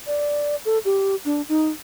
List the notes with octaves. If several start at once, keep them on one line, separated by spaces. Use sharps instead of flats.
D5
A4
G4
D4
D#4